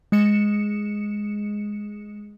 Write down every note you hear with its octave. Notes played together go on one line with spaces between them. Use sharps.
G#3 C#7 E7